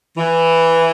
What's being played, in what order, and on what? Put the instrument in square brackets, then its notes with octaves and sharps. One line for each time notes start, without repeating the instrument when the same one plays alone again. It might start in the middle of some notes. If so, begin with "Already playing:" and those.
[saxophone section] E3